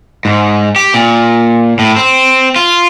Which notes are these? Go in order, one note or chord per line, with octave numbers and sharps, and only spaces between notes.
G#2
G4
A#2
A2
C4
F4